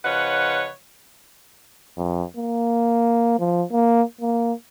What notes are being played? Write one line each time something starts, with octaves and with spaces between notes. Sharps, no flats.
C#3 F3 B4 C#5 D#5 F#5
F2
A#3
F3
A#3
A#3